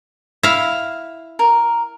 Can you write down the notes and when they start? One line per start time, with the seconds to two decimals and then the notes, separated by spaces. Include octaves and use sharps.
0.43 E4 F5
1.39 A#4